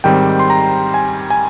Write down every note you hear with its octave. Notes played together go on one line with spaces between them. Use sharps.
G#2 D#3 G3 C4 G5
C6
A#5
G#5
G#5